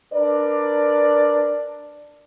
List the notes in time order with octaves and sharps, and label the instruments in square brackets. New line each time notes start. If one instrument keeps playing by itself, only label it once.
[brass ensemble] D4 A#4 B4 D5